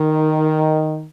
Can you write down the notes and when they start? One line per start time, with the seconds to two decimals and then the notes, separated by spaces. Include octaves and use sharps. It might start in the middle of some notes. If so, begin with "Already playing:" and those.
Already playing: D#3